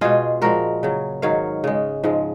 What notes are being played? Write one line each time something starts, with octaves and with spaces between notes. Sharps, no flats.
B2 G#3 F4 G#4
A#2 F3 G#3 F#4 A#4
C#3 F#3
G#2 D#3 F#3 C#5 F5
C#3 G#3
G#2 F3 G#3